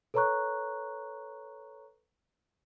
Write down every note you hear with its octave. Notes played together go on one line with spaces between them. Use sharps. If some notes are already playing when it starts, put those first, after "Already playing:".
A4 B4 C#5 A#5 C#6 F#6